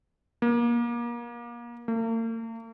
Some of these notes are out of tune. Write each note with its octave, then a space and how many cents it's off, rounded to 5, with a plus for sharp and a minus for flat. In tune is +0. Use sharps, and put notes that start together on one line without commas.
A#3 +30
A#3 -45